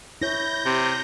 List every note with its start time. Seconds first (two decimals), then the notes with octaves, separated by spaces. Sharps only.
0.22 E4 C#5 G6 A#6
0.65 C3